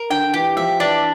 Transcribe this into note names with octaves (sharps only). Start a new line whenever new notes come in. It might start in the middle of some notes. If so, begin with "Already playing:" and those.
Already playing: A#4
D3 G5
E3 G4
F3 E5
E3 D4